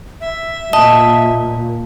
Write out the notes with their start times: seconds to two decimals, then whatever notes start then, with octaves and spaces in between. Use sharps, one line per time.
0.21 E5
0.73 A#2 D#5 A5